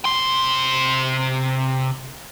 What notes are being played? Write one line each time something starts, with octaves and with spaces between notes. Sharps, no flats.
C3 C6